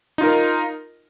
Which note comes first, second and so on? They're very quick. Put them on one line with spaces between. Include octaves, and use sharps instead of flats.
D#4 F4 A#4